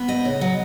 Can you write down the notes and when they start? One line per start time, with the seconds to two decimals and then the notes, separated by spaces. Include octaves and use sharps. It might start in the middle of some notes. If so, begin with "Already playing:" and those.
Already playing: B3
0.08 D2 D#5
0.25 C#3
0.41 F#3